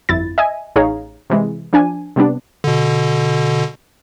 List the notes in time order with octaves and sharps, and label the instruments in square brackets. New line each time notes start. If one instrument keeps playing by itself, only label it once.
[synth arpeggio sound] G1 F2 E4 A6
D#5 E5 G#5
A1 D#4 G#4 C#5 F5 A#5
C3 E3 G#3
F3 D4 G#5
C3 G3 B3 D4
[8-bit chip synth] B2 D3